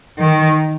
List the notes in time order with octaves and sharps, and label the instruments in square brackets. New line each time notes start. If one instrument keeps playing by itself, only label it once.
[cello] D#3